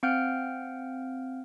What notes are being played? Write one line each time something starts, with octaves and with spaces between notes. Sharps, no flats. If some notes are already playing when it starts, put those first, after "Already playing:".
C4 F5 F#5 F6 G6 D7